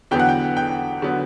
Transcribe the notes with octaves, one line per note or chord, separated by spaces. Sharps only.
E2 D3 F#3 B3 G5
F#5
G5
G5
D3 F#3 B3